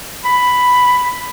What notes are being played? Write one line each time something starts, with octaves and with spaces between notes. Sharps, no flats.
B5